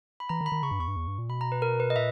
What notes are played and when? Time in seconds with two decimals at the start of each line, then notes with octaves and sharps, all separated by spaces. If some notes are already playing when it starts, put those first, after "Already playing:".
0.20 B5
0.29 E3 A#5
0.41 D#3
0.46 B5
0.52 D#3
0.63 C#3 C#6
0.71 G2
0.79 E2 C#6
0.88 G2
0.96 E2
1.07 G2
1.18 A#2
1.29 B2 B5
1.41 A#5
1.52 B4
1.62 A#4
1.80 B4
1.90 D#5
1.96 A#2 E5